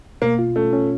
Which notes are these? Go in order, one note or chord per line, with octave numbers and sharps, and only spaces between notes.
B2 A#3
F4
A3 C#4
C#4